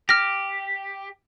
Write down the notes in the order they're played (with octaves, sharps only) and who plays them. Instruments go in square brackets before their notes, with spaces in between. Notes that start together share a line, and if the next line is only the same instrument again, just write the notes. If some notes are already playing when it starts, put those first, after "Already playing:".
[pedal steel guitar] G4 [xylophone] F6 A#6